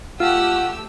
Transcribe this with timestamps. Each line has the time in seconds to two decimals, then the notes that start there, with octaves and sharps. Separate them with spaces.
0.20 A3 F4 G4 F#5 E6